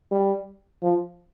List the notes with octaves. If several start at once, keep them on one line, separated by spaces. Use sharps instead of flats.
G3
F3